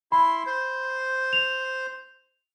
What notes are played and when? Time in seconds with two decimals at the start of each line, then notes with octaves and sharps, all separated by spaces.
0.12 E4 B5 C6
0.46 C5
1.33 F7